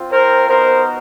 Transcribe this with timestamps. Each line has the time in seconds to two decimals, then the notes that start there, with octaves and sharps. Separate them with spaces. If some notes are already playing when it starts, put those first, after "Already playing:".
Already playing: C4 F4
0.10 A#4 C5
0.49 B3 D#4 F#4 A#4 C5